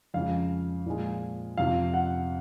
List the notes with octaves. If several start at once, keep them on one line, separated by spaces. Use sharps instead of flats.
F2 C#3 F3 G#3 F5
A#2 F3 G#3
F2 C3 F3 F5
F#5